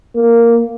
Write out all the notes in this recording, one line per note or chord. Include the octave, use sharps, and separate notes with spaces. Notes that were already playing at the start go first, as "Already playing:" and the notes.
A#3